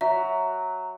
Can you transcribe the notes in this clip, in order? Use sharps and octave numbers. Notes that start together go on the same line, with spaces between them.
F#3 E5